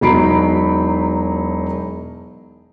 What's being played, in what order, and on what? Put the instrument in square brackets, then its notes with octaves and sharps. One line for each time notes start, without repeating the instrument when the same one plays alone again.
[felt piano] E1 F#3 D#4 B5 C7 D7